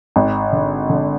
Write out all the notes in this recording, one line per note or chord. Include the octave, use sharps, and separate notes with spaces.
G#1
D3
D3